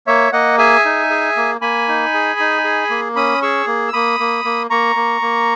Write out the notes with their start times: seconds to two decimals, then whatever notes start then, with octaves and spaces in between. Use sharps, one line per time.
0.07 A#3 C#5 E5
0.32 A#3 D#5 F#5
0.58 G#4 E5 G#5
0.85 D#4
1.10 G#4
1.37 A#3
1.61 A#3 G#5 B5
1.88 D#4
2.14 G#4
2.40 D#4
2.64 G#4
2.90 A#3
3.16 C#4 B5 D#6
3.42 G#4 C#6 E6
3.67 A#3
3.88 E6
3.93 A#3 B5 D#6
4.20 A#3
4.45 A#3
4.70 A#3 A#5 C#6
4.96 A#3
5.22 A#3